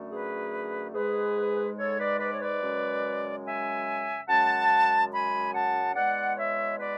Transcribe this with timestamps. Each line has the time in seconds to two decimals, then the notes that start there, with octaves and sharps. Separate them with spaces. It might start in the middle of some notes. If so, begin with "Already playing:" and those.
Already playing: F#2 D3 A3
0.11 G#4 B4
0.94 G#2 G#3 G#4 B4
1.77 A4 C#5
1.99 B4 D5
2.19 B4 D5
2.31 C#5
2.40 B4 D5
2.61 F#2 C#3 G#3
3.45 E5 G#5
4.28 F#2 C#3 G#3 F#5 A5
5.12 G#5 B5
5.53 F#5 A5
5.95 E2 B2 G#3 D5 F#5
6.37 C#5 E5
6.78 B4 D5